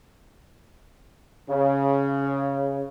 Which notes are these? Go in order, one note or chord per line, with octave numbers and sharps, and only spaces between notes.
C#3